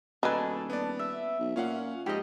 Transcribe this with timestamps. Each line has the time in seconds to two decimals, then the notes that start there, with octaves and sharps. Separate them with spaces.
0.23 D#1 B2 D4 D#4 A4 B4 G#5
0.70 B3 D5
0.99 E5
1.40 B1
1.56 A#2 C#4 F5 F#5
2.06 F2 G#2 G4 D#5